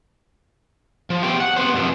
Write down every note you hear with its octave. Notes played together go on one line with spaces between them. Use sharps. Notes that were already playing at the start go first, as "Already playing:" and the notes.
F3
A3 B3 F4 G4 G5
F#5
B3 C4 B4 C5
F#2 C3 F3